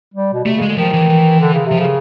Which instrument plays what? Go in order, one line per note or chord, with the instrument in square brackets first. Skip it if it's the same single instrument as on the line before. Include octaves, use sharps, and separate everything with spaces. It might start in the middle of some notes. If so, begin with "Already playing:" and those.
[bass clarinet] G3
B2
[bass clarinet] C3 [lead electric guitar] A3
[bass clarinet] C#3
[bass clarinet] D3 [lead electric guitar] G#3
[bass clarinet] D#3 [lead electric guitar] F3
[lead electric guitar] E3
E3
[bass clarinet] D3
C#3
C3
[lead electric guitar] F3
[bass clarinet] C#3